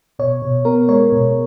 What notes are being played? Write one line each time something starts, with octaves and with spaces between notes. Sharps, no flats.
B2 C#5
B2
B3 A#4
G#3 C#5
B2